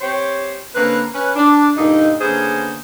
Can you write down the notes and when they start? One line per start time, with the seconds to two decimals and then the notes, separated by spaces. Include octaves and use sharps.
0.01 C4 G4 C5 C#5
0.75 D3 A#3 C4 C#4 B4
1.14 C#4 B4
1.36 D4
1.78 G2 A#2 D3 A#3 D#4
2.20 D3 A#3 B3 C#4 G#4 C5